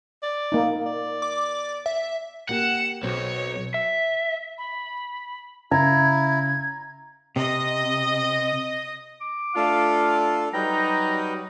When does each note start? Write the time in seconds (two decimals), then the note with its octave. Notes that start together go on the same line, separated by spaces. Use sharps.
0.23 D5
0.52 A#3 D#4
0.86 D5
1.22 D6
1.86 E5
2.49 A#3 G4 F#5 C#7 E7
3.03 B1 F#3 C4 C#5
3.74 E5
4.58 B5
5.71 C#3 E4 A#5 G#6
7.36 C3 D#5
9.21 D6
9.56 A3 D4 F4 A4 F5
10.54 F#3 G3 D#4 B4 G5 A#5